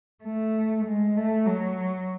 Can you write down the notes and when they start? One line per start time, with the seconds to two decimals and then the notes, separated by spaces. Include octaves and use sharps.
0.24 A3
0.86 G#3
1.17 A3
1.46 F#3